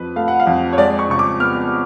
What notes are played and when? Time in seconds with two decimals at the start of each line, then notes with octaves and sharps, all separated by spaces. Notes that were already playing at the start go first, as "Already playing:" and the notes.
Already playing: F2 F3 B4
0.16 A3 F5
0.28 F#5
0.40 F5
0.47 F2
0.73 C#5
0.78 G#3 D5
0.99 C#6
1.09 C#3 C#6
1.19 D6
1.40 B3 F6